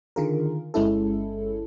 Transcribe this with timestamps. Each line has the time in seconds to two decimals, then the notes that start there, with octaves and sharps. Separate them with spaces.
0.16 D3 D#3 F4 G#4 A#4
0.74 G1 G#3 C#4 E4 A4